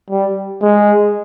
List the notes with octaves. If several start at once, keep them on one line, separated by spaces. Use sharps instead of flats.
G3
G#3